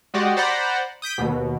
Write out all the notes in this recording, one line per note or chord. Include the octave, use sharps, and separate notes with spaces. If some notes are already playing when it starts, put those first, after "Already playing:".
G#3 F#4 G4 D5 D#5
C5 D5 F#5 A#5 B5
D#6 G6 B6 D7
D#2 B2